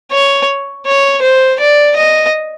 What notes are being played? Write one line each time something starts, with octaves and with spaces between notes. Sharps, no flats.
C#5
C#5
C5
D5
D#5